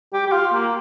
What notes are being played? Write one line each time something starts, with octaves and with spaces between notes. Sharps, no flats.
G4
G4
F4
A#3